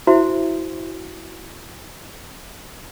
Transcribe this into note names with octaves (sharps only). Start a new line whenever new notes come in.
E4 F#4 C5 E5